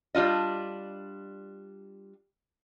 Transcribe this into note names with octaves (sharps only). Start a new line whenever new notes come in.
G3 D4 F4 D#5